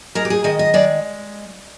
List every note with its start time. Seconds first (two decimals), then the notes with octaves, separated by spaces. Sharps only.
0.15 G#3 A#4
0.25 G4
0.30 G#4
0.44 D#3 D#5
0.59 D#5
0.74 G#3 D5